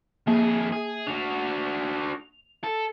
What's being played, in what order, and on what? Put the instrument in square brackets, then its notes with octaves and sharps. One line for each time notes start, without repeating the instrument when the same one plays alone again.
[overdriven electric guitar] F2 G#4 [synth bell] A#3
[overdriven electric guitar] G#4
[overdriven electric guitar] D4 F#4 [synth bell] F7
[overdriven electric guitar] A4